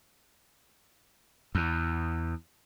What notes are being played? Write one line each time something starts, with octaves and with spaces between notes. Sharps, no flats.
E2